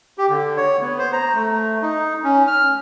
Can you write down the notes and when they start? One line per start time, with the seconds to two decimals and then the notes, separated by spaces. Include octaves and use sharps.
0.18 G4
0.29 D3
0.57 C#5
0.81 B3
0.98 C5
1.13 A#5
1.35 A3
1.82 D#4
2.24 C#4
2.48 F6